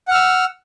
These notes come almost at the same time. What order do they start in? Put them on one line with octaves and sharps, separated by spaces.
F#5 F6 E6